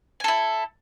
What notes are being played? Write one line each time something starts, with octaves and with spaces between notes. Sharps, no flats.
E4 A4 G#5